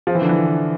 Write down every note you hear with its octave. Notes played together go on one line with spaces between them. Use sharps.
F3
E3
D3
E3